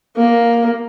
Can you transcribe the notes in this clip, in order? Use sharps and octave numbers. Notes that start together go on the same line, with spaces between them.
A#3